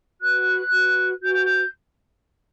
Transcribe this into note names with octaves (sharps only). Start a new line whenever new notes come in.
F#4 B4 F#6
F#4 B4
F#4 B4 G6